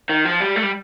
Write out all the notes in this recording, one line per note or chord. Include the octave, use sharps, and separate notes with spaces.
D#3
F3
G3
A3
G3